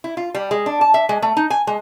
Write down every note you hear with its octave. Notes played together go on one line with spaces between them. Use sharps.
E4
F4
G3
G#3
D4
A5
E5
G#3
A3
D#4
G#5
G#3